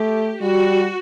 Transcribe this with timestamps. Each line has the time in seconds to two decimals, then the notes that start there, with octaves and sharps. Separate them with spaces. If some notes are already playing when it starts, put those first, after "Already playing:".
Already playing: A3 G4
0.41 G3 F#4